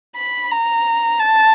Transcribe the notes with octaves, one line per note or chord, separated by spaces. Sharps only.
B5
A#5
A5